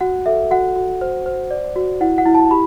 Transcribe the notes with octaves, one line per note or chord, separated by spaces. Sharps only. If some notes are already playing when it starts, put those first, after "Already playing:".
F#4 F#5
A4 E5
F#4 F#5
F#4
C5
C5
D5
F#4
E4 F#5
F#5
E4
A5
G4 B5